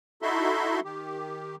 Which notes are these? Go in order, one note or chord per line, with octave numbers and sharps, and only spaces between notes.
D#4 E4 F#4 A4 E5 C6
D#3 G4